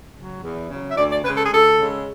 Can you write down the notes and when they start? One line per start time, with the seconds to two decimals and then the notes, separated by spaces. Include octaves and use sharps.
0.14 C#3 F#3
0.42 E2
0.69 C#3 F#3
0.89 E5
0.96 D2 D5
1.10 D5
1.24 C#3 B4
1.28 G#3
1.37 A4
1.45 G#4
1.51 D2 A4
1.78 C#3 G#3